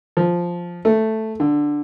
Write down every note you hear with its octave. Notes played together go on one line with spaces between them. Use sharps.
F3
A3
D3